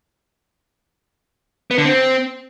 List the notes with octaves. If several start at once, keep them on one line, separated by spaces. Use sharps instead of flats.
B3
D3
C4